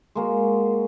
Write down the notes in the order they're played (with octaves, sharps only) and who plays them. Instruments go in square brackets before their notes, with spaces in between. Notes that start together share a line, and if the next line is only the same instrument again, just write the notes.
[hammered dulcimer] G#3 A#3 F#4